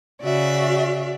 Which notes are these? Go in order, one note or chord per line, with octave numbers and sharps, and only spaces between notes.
C#3 F#4 D5 E5